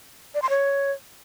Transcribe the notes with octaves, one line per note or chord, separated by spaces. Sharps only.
D5
C6
C#5